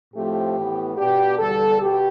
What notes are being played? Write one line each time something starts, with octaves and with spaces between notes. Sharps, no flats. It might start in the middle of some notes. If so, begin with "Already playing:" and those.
A2 F3 A3 C4 G4
A2 E3 B3
B2 B3 D4 G4
E2 D3 G3 A4
B2 G4